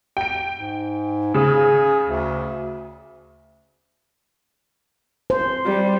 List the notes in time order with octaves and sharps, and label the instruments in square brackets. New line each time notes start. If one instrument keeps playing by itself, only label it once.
[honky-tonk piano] G5 D7
[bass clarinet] G#2
[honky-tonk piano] C#3 [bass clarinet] G#4
[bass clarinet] D2
[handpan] C5
[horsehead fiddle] G3